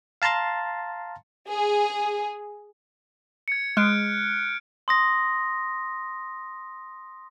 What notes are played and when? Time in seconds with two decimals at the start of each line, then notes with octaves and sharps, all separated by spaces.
0.22 F5 A5 A#5 C6 A6
1.48 G#4
3.48 G#6 C#7
3.77 G#3 F6 F#6 D7
4.88 C6 D#6 A#6